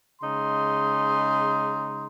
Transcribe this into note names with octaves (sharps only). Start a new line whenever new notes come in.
C#3 G#3 D#4 C6